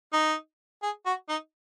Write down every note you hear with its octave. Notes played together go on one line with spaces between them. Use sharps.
D#4
G#4
F#4
D#4